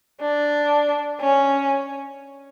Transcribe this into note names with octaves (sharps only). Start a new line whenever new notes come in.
D4
C#4